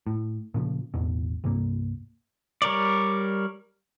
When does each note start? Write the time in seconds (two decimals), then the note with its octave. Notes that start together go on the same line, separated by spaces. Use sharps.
0.07 A2
0.54 A#2 C#3 F3
0.94 A1 E2 B2
1.44 C2 G2 A#3
2.62 G3 A#4 C#5 D5